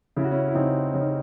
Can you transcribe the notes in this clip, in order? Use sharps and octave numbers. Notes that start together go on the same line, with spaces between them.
C#3 E4
F#4
C#4 E4
E4
C#3 C4 D#4
C#3 C#4
D#4